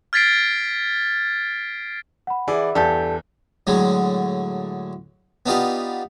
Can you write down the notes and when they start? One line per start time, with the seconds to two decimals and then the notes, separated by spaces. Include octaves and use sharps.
0.13 F6 G#6 A6 B6 C7 D7
2.27 F#5 B5
2.48 E3 G#4 D5
2.75 E2 G2 G4 A4 D5 A5 G6
3.67 A2 D3 F#3 G#3
5.46 B3 D4 D#4 F4 G4 D5